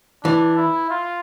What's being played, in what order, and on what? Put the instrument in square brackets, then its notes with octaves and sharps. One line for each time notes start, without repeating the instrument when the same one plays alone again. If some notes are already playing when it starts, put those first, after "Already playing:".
[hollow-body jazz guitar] E3 [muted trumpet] D4
[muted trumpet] E4
F4